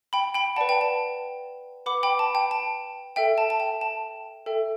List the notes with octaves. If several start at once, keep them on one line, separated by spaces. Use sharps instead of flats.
G5 B5
G5 B5
B4 D5 F#5 A5
G5
A5
B4 F#5 B5 D6
G5 B5
A5
G5
A5
A4 E5 G5
A5
A5
G5
A5
A4 E5 G5